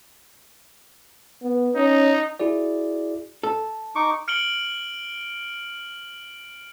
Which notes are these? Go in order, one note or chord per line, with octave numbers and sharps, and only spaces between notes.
B3
C#4 D#4
E4 F#4 G#4 D5
A4
D#4 C#6 D6
F6 C#7 D7 F#7 G7